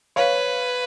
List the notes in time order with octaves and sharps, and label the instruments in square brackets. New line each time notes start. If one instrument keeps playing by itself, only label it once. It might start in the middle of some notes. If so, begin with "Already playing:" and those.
[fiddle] B4 [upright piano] C#5 F5